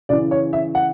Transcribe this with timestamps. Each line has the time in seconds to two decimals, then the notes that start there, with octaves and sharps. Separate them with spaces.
0.09 C#3 E3 D5
0.31 C#5
0.53 E5
0.75 F#5